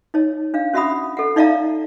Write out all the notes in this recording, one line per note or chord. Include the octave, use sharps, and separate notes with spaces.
D#4 C#5
D4 F5
C#4 F#4 E5 F#5 B5 D#6
A4 F#5
D#4 D5 E5 F5 A5 A#5